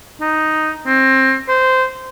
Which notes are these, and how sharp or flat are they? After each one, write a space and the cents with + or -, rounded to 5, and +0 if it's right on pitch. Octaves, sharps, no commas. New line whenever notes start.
D#4 +0
C4 +20
C5 -15